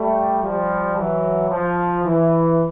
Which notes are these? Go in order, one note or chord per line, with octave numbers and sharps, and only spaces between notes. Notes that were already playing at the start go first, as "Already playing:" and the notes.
Already playing: G3 A3
F3 G3
E3 F#3
F3
E3